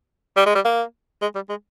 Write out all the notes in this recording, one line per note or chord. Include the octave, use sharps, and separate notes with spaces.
G3
G#3
G3
A#3
G#3
G3
G#3